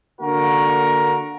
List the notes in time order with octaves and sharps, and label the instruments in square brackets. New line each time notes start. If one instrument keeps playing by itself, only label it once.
[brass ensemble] D3 A#3 F#4 A#4